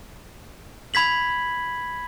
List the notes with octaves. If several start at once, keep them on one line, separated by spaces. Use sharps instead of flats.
B5 G#6 B6 F#7